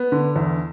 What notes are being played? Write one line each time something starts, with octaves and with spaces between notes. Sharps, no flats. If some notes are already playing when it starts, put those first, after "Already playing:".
Already playing: B3
D3
E2